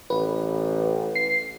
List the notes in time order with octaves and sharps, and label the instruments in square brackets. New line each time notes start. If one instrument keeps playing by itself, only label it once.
[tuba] A1 [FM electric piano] B4
[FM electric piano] C7